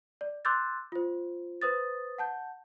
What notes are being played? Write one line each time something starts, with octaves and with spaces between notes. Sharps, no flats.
D5
C6 D6 E6 F#6 G6 A6
F4 C5
B4 C5 D#6 A6
F#5 A5 G6